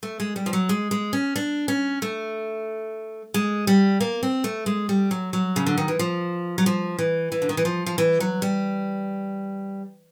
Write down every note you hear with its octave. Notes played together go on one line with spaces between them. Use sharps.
A3
G#3
G3
F3
F#3
G#3
G#3
C#4
D4
C#4
A3
G#3
G3
A#3
C4
A3
G#3
G3
F#3
F#3
C#3
D3
D#3
E3
F3
F#3
F3
E3
E3
D3
D#3
E3
F3
F3
E3
F#3
G3